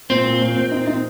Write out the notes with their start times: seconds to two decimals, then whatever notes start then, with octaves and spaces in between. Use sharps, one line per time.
0.10 A#2 C4
0.26 A#2
0.41 A#2
0.56 A#2
0.72 D#4
0.87 D#4